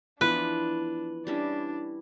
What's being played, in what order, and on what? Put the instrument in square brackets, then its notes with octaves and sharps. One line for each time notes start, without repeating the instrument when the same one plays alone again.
[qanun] E3 F3 B3 [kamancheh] D4 [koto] B4
[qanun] G3 C#4 E4 [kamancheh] D4